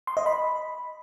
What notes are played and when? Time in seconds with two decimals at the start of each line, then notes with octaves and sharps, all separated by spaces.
0.07 C6
0.17 D#5
0.26 B5